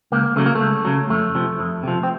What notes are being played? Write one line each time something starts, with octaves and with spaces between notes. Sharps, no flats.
C#2 A#3
C#3 F#3 A3
A#3
A3
C#2
C#3 F#3
F2 A3
C3 F3
F2
C3 F3
C4